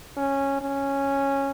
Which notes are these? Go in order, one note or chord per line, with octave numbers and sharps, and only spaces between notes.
C#4
C#4